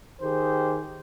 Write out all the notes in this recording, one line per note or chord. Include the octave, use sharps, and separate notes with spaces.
D#3 G4 G#4 C5